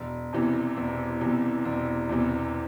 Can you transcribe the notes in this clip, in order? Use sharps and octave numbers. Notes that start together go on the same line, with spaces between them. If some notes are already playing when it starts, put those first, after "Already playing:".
Already playing: E1
E2 C3 E3
E1
E2 C3 E3
E1
E2 C3 E3